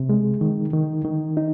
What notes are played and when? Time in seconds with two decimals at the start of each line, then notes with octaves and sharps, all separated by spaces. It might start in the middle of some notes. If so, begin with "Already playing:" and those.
Already playing: C3
0.09 G#3
0.41 D#3
0.73 D#3
1.05 D#3
1.37 D#4